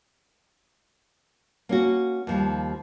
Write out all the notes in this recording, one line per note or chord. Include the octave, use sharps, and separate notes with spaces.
A#3 C#4 F#4
D#2 F3 G3